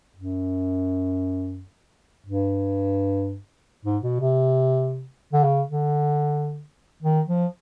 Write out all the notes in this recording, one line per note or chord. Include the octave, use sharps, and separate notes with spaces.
F#2
G2
G#2
B2
C3
D3
C#3
D3
D#3
F3